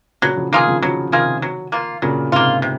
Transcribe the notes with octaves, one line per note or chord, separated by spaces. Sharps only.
A#2 C#3 F#3
C#3 F3
C3 D#3 A#3 F4 G#4
C#3 F3
C#3 F3 F#3
C3 D#3 A#3 F4 G#4
F#3
A#3 F4
A#2 C#3 F#3
G#2 C3 A#3 F4
C3